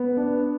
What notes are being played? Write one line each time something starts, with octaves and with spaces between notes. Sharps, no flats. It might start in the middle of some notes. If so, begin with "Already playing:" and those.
Already playing: B3
D4